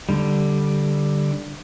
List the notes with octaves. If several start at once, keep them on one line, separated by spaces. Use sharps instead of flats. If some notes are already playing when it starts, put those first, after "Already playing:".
D3 G3